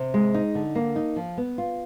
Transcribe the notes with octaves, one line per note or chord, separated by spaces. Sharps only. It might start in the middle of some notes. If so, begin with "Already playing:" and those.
Already playing: C3
G#3
D#4
D3
A#3
D#4
F3
B3
F4